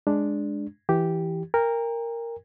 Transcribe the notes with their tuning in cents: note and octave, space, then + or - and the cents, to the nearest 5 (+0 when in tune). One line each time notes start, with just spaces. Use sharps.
G#3 +0 D4 +0
E3 +0 G4 -5
A#4 -5 G5 +40